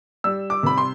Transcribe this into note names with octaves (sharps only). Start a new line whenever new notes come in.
G3 E6
D6
C3 B5
C6